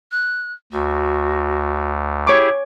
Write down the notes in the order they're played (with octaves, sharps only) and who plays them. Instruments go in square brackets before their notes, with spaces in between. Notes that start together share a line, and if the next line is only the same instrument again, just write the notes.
[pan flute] F#6
[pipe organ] D2 [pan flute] F#4
[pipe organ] E4 G4 G#4 [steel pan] C#5 C#6 D6